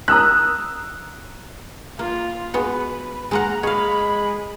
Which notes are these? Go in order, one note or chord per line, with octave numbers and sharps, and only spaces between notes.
A#5 D#6 E6 F#6
A#3 F4
G#3 B3 F#4 B4
G#3 A#3 F#5 A#5
G#3 C#5 F5 B5